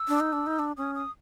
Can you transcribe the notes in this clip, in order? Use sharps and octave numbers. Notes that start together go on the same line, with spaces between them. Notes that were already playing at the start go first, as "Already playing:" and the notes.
Already playing: E6
D4
D#4
D4
D#4
D4
C#4 D#6
D#6